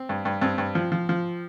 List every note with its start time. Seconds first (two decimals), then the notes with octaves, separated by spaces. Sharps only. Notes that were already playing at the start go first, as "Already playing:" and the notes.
Already playing: C4
0.09 G2
0.25 G2
0.42 G2 C4
0.58 G2
0.75 F3
0.92 F3
1.09 F3